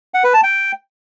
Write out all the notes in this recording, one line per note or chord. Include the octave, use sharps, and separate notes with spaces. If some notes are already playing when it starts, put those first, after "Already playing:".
F#5
B4
A5
G5